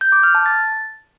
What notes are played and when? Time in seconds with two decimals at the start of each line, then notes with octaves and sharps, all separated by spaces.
0.01 G6
0.12 D6
0.23 F6
0.35 A5
0.46 A6